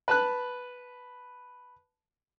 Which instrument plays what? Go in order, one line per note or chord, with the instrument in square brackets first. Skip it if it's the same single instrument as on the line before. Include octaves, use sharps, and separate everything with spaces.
[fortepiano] B4 A5 B5 F#6